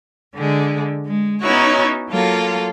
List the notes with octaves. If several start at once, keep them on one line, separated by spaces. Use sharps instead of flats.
D3 G#3
G#3
B3 C#4 D#4 E4 F#4 C#5
F#3 A#3 F4 A4